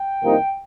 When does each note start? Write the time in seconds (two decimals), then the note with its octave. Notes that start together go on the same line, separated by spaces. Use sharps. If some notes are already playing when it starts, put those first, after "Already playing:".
Already playing: G5
0.23 C2 C3 F3 A#3 D#4